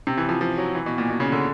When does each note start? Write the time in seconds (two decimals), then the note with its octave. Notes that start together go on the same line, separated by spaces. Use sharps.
0.07 C3
0.17 E3
0.29 F3
0.41 F3
0.58 F#3
0.75 E3
0.86 B2
0.98 A#2
1.09 B2
1.20 C#3
1.32 D3